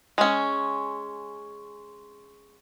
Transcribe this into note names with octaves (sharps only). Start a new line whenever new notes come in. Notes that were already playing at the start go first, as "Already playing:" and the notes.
G#3 C#4